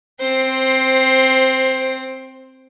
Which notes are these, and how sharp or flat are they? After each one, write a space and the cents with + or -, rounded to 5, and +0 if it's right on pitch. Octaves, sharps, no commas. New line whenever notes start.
C4 +0 C5 +15